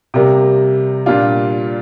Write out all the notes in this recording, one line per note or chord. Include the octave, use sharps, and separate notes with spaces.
C3 G3 A#3
A#2 G3 D4 F4